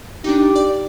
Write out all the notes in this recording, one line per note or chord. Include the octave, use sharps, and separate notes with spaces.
D4 D#4 G4
D5